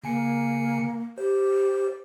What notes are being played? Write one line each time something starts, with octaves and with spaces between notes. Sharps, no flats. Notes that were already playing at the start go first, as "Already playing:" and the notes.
C#3 A#3 G#5 C#7
G4 C5